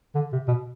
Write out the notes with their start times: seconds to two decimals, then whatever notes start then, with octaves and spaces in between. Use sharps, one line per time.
0.15 D3
0.32 C3
0.48 B2